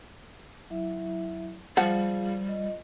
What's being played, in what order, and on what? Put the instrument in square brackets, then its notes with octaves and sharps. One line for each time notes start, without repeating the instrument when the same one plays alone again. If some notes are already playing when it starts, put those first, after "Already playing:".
[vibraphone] F#3 E4 E5
[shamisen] F3 F#5 [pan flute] G3 [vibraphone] F4 G#4 F5
[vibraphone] F4 D#5